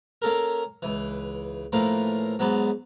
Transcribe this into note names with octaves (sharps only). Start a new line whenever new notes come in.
A#3 C#4 A4 A#4
C#2 E3
A2 E3 F3 A#3
G#2 F#3 B3 A5